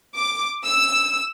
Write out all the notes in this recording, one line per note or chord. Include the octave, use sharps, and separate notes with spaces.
D6
E6